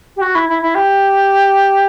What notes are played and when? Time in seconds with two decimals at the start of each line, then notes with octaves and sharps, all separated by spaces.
0.16 G4
0.21 F#4
0.35 E4
0.49 E4
0.62 E4
0.74 G4